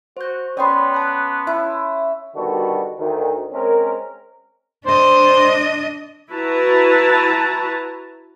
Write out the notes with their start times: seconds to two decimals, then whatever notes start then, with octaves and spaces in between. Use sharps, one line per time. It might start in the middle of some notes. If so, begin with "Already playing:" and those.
0.17 F#4 C5 G6
0.57 B3 C#4 D5 G5 B5 C6
0.94 A5 F#6
1.47 E4
2.35 B2 D3 D#3 G3 F#4 A4
2.99 D2 D#3
3.53 G#3 C4 C#4 A#4
4.86 D4 C5 D#5
6.32 E4 F#4 B4 A5 A#5